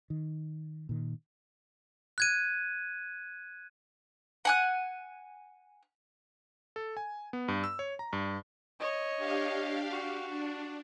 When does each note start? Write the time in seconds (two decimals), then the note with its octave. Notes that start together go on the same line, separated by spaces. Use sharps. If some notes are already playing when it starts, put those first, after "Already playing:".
0.10 D#3
0.89 A#2 D#3
2.18 F#6 G#6 D#7
4.45 F#5 G#5 F#6
6.76 A4
6.97 G#5
7.33 B3
7.48 G2
7.64 E6
7.79 C#5
7.99 A#5
8.13 G2
8.80 C#5 D#5
9.17 D4 G4 F5
9.91 F#4
10.30 D4